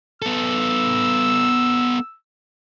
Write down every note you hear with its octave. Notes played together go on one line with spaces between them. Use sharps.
B3 A4 E6